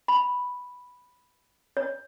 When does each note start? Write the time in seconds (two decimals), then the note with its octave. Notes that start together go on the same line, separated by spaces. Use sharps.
0.08 B5
1.77 C#5